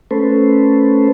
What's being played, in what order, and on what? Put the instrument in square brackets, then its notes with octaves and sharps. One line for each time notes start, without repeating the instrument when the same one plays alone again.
[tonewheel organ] A3 C#4 A4 B4 C5